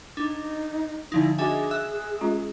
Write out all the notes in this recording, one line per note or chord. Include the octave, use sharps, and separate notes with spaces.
D4 D#4
D3 F3 D#4 E4
D4 F#4 G#4 D#5 E5 G#5
E5 E6 F#6
G#3 C#4 F4